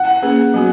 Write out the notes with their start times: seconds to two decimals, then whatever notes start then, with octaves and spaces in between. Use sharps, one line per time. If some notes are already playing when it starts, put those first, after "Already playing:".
Already playing: F#5
0.23 A#3 C#4 G#4 B4
0.54 F#3 B3 F#4